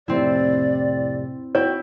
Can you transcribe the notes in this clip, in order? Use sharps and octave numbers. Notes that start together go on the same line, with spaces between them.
F2 A2 C3 C4 E4 D5
E4 F#4 C#5 G5